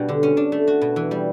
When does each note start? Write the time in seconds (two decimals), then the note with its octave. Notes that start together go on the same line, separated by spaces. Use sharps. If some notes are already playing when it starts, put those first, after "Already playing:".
Already playing: B2 G3 D4
0.09 D3
0.23 C#4
0.37 D4
0.52 A3
0.67 F#4
0.81 B2
0.96 E3
1.11 G3